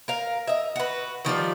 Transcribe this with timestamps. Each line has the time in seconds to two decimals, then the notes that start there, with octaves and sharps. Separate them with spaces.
0.08 A#4 F5
0.47 D#5 E5
0.76 F#4 B4
1.25 D#3 F3 G3 D5